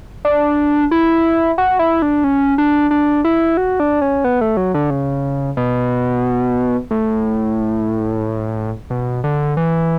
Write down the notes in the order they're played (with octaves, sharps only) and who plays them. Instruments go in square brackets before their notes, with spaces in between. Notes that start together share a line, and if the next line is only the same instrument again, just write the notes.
[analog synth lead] D4
E4
F#4
E4
D4
C#4
D4
D4
E4
F#4
D4
C#4
B3
A3
F#3
D3
C#3
B2
A2
B2
D3
E3